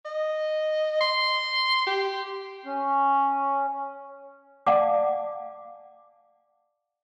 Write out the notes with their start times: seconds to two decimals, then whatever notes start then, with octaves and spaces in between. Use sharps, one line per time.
0.06 D#5
1.01 C6
1.87 G4
2.66 C#4
4.66 D5 F5 F#5 G#5 A5 D6